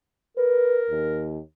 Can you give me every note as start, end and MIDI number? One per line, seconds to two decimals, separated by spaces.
0.37 1.41 70
0.37 0.80 71
0.90 1.38 39